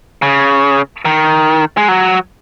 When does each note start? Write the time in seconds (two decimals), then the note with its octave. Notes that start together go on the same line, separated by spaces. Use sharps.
0.22 C#3
1.05 D#3
1.77 G#3
1.88 F#3